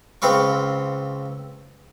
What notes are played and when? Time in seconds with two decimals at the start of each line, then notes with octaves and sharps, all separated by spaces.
0.22 C#2 C4 B4 F5 C#6